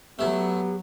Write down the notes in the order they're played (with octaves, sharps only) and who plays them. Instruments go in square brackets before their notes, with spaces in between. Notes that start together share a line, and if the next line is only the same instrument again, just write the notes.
[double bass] F#3 [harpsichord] A3 E4 [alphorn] B3 [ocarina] G4